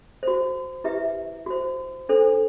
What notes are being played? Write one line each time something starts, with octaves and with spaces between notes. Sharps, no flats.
F#4 C5
E4 G4 B4 E5
F#4 C5
D4 A4 C5